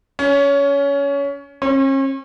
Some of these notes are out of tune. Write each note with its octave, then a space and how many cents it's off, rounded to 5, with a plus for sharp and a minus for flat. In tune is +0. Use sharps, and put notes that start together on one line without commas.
C#4 +20
C#4 -40